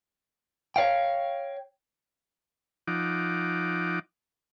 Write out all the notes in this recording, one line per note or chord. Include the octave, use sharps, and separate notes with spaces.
C#5 D5 F5 G5
F3 D#4 F#5 D6